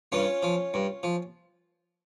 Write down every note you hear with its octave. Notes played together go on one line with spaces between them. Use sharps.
G2 C#4 F4
F3
G2
F3